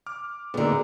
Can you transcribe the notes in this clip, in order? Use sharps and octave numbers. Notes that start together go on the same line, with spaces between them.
D6 F6
D2 D3 A#3 B3 D#4 G#4